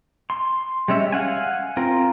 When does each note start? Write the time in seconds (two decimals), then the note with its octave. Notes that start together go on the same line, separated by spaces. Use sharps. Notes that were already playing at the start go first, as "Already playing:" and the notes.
0.30 C6
0.88 G3 G#3 C#4 E5
1.12 F5 F#5 G#5
1.77 C4 F4 A#4